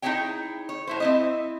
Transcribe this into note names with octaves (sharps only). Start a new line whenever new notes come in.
D#4 E4 G4 G#4 C#5 G5
C#5
A2 E4 C5
C4 E4 D#5